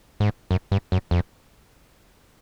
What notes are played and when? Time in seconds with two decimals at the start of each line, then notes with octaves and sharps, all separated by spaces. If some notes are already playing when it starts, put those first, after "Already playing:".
0.20 G#2
0.51 F#2
0.72 G2
0.92 F#2
1.11 F2